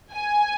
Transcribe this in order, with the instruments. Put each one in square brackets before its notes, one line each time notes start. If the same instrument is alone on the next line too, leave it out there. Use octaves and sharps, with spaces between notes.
[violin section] G#5